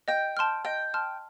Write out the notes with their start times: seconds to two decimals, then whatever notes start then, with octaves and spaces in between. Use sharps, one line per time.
0.08 D#5 G5
0.37 A5 C6 F6
0.65 D#5 G5
0.94 A5 C6 F6